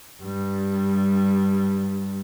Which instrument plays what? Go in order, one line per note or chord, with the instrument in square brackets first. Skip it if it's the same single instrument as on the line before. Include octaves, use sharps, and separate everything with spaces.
[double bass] G2 G3